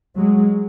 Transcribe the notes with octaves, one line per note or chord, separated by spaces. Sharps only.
F#3 G#3